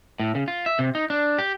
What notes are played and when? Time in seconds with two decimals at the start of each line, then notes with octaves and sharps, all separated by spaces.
0.20 A2
0.35 C#3
0.48 F4
0.66 E5
0.79 C3
0.95 D#4
1.10 D4
1.39 G4